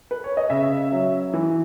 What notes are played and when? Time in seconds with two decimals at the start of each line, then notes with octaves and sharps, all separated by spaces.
0.11 B4
0.24 C#5
0.37 D#5
0.50 C#3 E5
0.92 F#3 C#4
1.34 E3